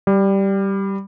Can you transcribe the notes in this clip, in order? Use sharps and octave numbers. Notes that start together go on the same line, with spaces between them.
G3